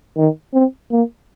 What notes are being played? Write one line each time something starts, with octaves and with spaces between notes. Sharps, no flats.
D#3
C4
A#3